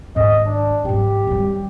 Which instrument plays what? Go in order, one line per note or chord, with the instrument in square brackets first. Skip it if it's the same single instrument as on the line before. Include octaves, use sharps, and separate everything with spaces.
[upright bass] G#2 D#3 [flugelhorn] D#5
[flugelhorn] D4
[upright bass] G#2 F#3 [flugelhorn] G4
[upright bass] F#2 G3